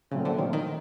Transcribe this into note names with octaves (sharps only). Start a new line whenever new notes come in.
A#2 C#3 F#3 A3 C4
D3
D#3
D#3